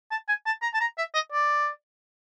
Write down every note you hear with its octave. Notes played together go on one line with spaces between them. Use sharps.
A5
G#5
A5
A#5
A5
A#5
E5
D#5
D5